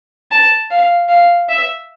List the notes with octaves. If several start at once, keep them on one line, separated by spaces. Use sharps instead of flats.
A5
F5
F5
E5